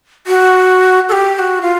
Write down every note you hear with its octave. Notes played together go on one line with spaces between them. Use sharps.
F#4
A4
G4
G4
F#4
F4